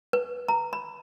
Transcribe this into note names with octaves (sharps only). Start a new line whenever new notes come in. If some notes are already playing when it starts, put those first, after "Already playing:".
B4
A#5
B5